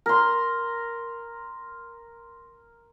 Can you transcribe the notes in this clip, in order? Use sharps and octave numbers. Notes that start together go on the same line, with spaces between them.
A#4 C6